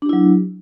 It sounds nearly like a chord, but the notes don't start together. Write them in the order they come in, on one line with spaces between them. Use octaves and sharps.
D4 G4 E4 F#3